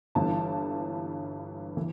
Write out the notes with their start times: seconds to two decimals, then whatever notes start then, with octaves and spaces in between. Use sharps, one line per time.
0.15 G1 G2 E3 A5
1.77 E3